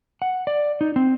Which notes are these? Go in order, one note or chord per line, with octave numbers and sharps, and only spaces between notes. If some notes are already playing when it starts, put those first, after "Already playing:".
F#5
D5
D#4
C4